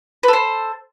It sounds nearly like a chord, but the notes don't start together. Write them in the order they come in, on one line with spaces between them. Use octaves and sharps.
B4 A4 C5